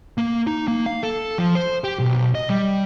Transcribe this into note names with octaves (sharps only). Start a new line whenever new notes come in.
A#3
D#4
A#3
F5
A4
F3
C5
G4
B1
D#5
G3